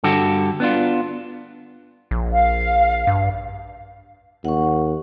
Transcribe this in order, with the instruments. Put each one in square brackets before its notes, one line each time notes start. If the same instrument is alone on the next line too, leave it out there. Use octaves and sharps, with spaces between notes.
[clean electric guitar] G2 D3 F#4 G4 A4
B3 D4 F4
[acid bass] A#1
[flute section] F5
[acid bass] G2
[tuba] D#2 [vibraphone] F#5 C#6